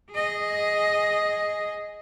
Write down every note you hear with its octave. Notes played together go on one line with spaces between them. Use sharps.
G#4 D#5